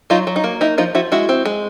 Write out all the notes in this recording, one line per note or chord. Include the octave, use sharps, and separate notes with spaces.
F#3 D#4 F4
F#3
D#4
A#3
D#4 E4
F3 D#4 F4
F3 E4 F#4
G#3 E4 F#4
C4
G#3